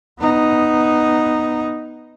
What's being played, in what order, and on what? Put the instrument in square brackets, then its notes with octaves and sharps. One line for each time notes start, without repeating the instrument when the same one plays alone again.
[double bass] B3 D#4